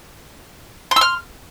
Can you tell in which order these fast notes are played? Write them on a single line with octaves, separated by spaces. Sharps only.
C6 E6 F6